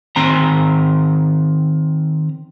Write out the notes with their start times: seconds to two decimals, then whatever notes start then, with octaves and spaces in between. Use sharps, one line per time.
0.16 D#3 C4 A#5